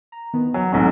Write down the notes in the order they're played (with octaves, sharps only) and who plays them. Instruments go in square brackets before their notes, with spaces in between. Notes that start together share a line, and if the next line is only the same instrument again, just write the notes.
[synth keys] A#5
D#3 E3 B3
[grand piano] F#3
[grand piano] B1 G#2 F#3 [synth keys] C4 C#4 D#4